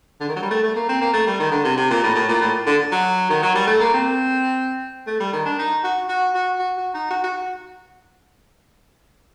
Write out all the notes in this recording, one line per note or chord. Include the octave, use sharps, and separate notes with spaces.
D3
D#3
F#3
G3
A3
A3
A#3
C4
A#3
A3
G3
D#3
D3
C3
C3
A#2
A2
A2
A#2
A2
D3
F#3
D#3
F#3
G3
A3
A#3
C4
A3
G3
D#3
D4
D#4
F#4
F#4
F#4
F#4
F#4
D#4
F#4
F#4